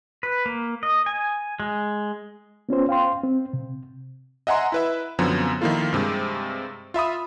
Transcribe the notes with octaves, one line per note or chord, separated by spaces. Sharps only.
B4
A#3
D#5
G#5
G#3
B3 C#4 F4 C5
F5 G5 C6
C4
C3
D#5 E5 F#5 G#5 A#5 C6
E4 B4 E5
F#2 D3 F3 B3 C4
D#3 F3 A#3 E4 F4 A4
G2 C3 G#3
F4 E5 B5 D#6